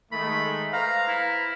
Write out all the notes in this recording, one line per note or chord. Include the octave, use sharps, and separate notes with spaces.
D#3 G#3 A3 B5
B4 C5 F5 A#5
E4